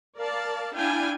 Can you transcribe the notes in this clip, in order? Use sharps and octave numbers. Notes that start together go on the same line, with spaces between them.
A#4 D5 F5 A5
D4 E4 F5 G5 G#5